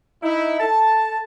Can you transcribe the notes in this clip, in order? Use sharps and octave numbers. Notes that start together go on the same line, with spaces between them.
D#4 E4
A4 A5